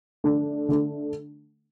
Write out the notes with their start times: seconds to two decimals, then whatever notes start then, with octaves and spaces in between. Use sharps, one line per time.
0.24 D3 A3 D4
0.68 D3 A3 D4